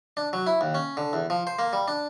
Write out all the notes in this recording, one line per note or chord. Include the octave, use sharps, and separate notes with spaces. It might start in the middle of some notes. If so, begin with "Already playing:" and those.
D4
F#3
E4
D#2
C#4
D3
E2
F3
C5
A#3
G3
D4